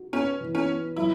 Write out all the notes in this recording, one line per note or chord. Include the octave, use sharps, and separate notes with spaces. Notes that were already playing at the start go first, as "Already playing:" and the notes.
Already playing: D#4 F#4
B3 C#4
E3
C#4
B3
F#3 E4